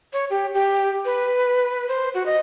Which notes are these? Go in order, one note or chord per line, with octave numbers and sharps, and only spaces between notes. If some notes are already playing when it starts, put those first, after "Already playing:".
C#5
G4
G4
B4
C5
F#4
D#5